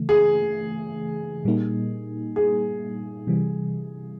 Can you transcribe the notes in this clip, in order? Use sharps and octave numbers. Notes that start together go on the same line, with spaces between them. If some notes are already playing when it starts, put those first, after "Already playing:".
Already playing: C#3 E3 A3
G#4
A#2 G3 A#3 D#4
G#4
C3 E3 G3